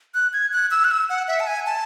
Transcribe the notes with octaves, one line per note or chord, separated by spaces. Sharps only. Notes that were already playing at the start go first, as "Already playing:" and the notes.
F#6
G#6
F#6
E6
F#6
E6
F#5
E5
A5
G#5
A5